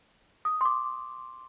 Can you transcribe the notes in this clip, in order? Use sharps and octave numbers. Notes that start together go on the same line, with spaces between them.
D#6
C6
D6